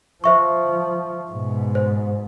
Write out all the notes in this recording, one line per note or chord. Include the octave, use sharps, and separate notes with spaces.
F3 C5 E5 C#6
G#2 B2
C5